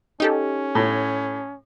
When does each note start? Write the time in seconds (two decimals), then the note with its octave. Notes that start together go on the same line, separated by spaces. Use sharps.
0.20 C#4 D#4 G4 A4
0.75 A2